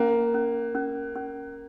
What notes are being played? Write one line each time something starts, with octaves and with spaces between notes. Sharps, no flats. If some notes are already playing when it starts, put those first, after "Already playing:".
Already playing: A#3 C#4
C#4
C#4
C#4